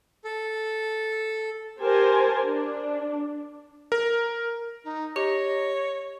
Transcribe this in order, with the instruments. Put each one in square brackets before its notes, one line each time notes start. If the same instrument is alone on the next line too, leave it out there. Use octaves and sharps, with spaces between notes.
[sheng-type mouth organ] A4
[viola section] G4 A#4 C5 G#5 A5
D4
[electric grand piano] A#4
[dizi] D#4
[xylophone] G4 [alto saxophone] C#5 [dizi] D#5